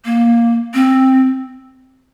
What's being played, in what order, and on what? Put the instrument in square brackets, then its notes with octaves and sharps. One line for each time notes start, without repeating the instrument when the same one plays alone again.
[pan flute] A#3
C4